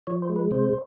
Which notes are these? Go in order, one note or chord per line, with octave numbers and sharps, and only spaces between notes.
F3 C#5
C5
G#3
B4
C3 C5